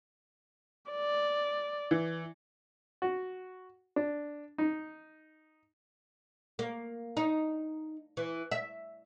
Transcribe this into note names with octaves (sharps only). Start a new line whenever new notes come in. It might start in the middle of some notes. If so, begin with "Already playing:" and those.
D5
E3
F#4
D4
D#4
A#3
D#4
E3
E5